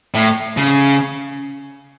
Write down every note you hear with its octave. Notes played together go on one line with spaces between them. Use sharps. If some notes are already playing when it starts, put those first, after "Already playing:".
A2
C#3